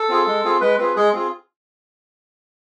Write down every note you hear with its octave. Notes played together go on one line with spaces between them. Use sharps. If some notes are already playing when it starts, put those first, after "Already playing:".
Already playing: A4
C4 F4 G#4
G#3
C4 F4 G#4
G#3 B4
C4 F4 G#4 B4
G#3 G#4
C4 F4 G#4